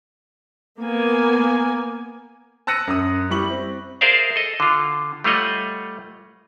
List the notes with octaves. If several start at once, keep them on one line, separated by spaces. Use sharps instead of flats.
A#3 B3 G#5
A5 E6 F#6 A#6 C#7 D#7
F#2 D#6
G3 E4 G4 C#6 F#7
C4
G#4 A#4 C5 D5 E5 F5
A4 D#5
D3 F4
G3 A3 F4 C#5 D#5 F#5